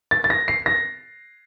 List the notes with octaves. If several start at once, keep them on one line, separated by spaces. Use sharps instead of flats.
A6
A6
A#6
C7
A#6